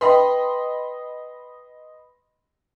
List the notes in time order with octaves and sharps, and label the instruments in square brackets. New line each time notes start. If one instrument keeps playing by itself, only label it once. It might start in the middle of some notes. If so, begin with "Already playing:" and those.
[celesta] B4 G5 [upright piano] D#5 B5 C6